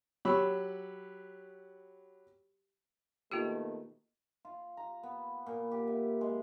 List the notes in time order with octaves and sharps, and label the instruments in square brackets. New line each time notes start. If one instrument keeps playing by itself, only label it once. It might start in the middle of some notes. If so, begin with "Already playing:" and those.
[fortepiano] F#3 G4 B5 C#6 E6
[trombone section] B2 D#3 A3 [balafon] A#3 F4 G4
[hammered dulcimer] F4
A#5
B3
A#2
G4
E5
G#3